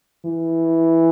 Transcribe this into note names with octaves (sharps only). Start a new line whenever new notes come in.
E3